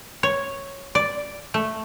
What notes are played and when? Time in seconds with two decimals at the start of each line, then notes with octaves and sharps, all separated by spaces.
0.23 C#5
0.95 D5
1.54 A3